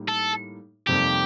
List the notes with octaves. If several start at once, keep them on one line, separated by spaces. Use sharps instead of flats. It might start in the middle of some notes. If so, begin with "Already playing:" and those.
Already playing: A2 G3 A#3 D#4
A4
F2 C3 G3 A#3 D#4 G4